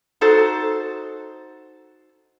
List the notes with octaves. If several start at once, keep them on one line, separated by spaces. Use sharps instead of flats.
D#4 F#4 A4 C5